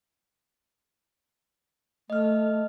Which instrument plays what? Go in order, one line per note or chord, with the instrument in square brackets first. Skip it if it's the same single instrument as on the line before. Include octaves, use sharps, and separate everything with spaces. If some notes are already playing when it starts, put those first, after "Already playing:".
[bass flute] A3 [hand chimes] D#5 F6